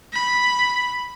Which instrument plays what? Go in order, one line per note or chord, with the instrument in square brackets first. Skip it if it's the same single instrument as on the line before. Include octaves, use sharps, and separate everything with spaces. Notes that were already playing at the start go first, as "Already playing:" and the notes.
[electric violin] B5